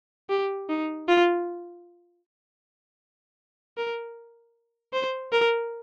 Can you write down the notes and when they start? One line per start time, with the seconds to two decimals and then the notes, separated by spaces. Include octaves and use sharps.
0.30 G4
0.69 D#4
1.08 F4
3.78 A#4
4.94 C5
5.32 A#4